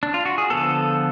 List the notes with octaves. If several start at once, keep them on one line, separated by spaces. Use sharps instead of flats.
D4
F4
F#4
G#4
D3 F3 B3 A4